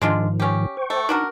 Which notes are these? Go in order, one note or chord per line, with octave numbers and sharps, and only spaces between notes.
G#2 D#3 F3 G#3 D4 F4
C#4 G4
C5 G5 C#6
A3
D4 D#4 F#4 A#4